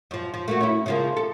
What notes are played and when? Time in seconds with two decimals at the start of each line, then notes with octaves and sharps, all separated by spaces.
0.11 F#2 F3
0.34 F3
0.48 A3 A#3 F#4
0.60 C#4 E4
0.86 C#3 F3 A#3
1.17 A4